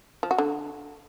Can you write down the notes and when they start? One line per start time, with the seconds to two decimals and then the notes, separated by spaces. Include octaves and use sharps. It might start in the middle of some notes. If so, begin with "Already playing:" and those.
0.23 F3
0.31 F#4
0.38 D3